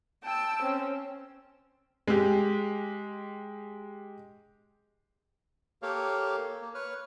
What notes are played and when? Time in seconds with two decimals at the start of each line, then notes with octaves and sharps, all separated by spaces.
0.23 G5 A5 E6
0.62 C4 C#4
2.08 G#3 G4
5.82 A#3 G4 A4 A#4 C#5 F5
6.61 A#3
6.74 B4 C#5 F6